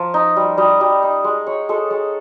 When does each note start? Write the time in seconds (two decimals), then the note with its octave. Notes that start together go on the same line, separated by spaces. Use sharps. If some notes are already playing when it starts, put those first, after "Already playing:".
Already playing: F3 A#5
0.14 D#4
0.36 G3
0.58 G3 D#5
0.81 G3
1.03 D#4
1.24 G#3
1.47 G#3 C#5
1.69 G#3 A4
1.90 G#3